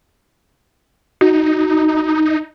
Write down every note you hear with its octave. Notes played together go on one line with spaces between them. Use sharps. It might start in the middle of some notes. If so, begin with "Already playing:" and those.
D#4 F#4